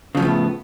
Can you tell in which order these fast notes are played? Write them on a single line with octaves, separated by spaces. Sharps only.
C#3 F3 A2 A3 B3